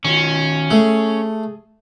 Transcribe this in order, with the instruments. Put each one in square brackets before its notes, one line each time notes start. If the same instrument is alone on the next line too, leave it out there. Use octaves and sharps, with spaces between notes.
[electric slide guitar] D#3 F#4 C#5 [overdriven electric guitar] C#4
[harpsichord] A3 [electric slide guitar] G#4